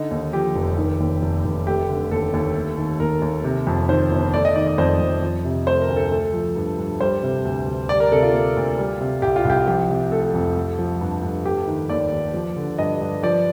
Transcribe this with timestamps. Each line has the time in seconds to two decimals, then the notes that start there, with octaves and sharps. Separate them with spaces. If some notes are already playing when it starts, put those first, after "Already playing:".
Already playing: D3 D#4
0.11 D#2
0.33 F3 G4
0.55 F1
0.77 D#3
1.00 D#2
1.22 F1
1.45 F1
1.67 A3 G4
1.89 D3
2.11 D#2 A4
2.33 D#2
2.55 A3
2.78 D#3
3.00 D#2 A#4
3.22 D#2
3.44 C3
3.67 F2
3.89 D#3 C5
4.11 G1
4.33 A3 D5
4.45 D#5
4.56 D#3 D5
4.67 D5
4.78 F2 C5
5.00 F2
5.22 F3
5.45 C3
5.67 A3 C5
5.82 A#4
5.89 D2
5.97 A4
6.11 A3
6.34 F3
6.56 G2
6.78 G2
7.00 G3 C5
7.23 C3
7.45 D2
7.67 D2
7.89 G3 D5
8.00 A#4
8.12 C3 A4
8.23 F4
8.34 A#3
8.57 D2
8.78 G3
9.01 C3
9.22 C2 G4
9.36 F4
9.45 C2 G4
9.67 F3 G4
9.90 C3
10.12 A3 A4
10.34 F2
10.56 A3
10.79 F3
11.01 G2
11.23 G2
11.45 A3 G4
11.68 D#3
11.90 D#2 D5
12.12 D#2
12.34 F3
12.57 D3
12.78 G2 D#5
13.01 G2
13.23 F3 D5